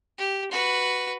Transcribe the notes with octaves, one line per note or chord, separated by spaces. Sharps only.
G4
F#4 B4